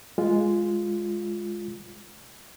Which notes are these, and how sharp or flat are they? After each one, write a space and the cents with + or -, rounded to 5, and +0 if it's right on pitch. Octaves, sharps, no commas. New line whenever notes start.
G#3 +0 F4 +0